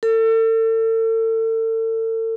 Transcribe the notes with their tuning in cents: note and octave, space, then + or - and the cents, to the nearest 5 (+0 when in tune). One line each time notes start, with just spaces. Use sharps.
A4 +35